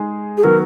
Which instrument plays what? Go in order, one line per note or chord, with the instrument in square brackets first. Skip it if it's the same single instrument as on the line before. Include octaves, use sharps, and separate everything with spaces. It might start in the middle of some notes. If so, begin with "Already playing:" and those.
Already playing: [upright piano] G#3 D#4 G#4
[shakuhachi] G#4
[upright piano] D#3 F#3 B3 F#4 [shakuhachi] A#4